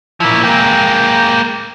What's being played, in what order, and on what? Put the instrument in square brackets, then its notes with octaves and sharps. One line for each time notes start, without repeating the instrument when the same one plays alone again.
[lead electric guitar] A#2 F3 [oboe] E4
[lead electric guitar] G#3 A#3 [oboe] G5